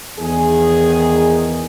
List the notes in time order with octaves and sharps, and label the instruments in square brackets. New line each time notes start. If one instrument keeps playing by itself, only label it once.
[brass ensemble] E2 D#3 G#4